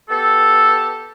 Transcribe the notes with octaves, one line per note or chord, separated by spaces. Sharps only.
B3 G4 A4